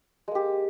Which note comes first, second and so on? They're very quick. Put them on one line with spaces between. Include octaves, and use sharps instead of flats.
G#3 A#3 G4